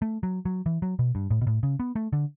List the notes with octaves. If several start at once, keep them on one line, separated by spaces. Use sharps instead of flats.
A3
F#3
F#3
E3
F#3
B2
G2
A2
B2
A2
C#3
B3
A3
D3